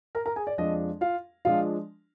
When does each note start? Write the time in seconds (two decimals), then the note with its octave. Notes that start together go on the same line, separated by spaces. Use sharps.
0.15 A#4 A#5
0.26 A#4 A#5
0.36 G#4 G#5
0.47 D5
0.58 F2 F3 G#3 D4 F4 D#5
1.01 F4 F5
1.45 F3 G#3 D4 F4 F5